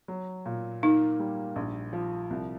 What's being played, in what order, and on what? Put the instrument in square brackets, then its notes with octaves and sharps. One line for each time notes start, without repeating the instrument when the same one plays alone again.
[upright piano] F#3
A#2
[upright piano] A#3 [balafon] D#4
[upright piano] G3
A#1
F3
C2